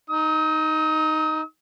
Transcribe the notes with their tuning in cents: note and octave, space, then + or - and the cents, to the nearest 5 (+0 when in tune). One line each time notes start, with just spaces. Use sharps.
D#4 +0 D#6 +40